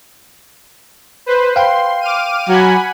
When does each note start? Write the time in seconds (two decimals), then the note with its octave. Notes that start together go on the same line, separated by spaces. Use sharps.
1.26 B4 C5
1.56 F5 G5 C6
2.01 D6 F6 D#7
2.49 F#3 F#5 G#5 B5